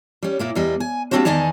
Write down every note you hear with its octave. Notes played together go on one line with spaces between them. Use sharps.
G3 C#4
A#2 A#3 E4
E2 G3 D#5
G#5
G3 A#3 C4 D4 F#4 C5
E2 D#3 D#4 D5 G#5 A5